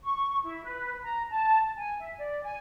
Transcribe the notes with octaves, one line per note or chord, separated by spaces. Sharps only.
C#6
E4
B4
A#5
A5
G#5
E5
D5
G#5